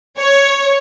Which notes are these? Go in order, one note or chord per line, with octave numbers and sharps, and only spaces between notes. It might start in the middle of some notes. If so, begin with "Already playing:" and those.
C#5